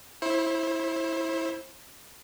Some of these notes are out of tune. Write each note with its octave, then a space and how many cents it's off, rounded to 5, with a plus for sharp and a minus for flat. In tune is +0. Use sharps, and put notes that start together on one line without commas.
E4 -5 C5 +35